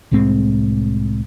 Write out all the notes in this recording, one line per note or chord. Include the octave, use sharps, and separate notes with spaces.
C2 A2 G#3 C4